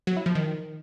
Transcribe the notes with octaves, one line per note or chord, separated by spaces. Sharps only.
F#3
E4
F3
D#3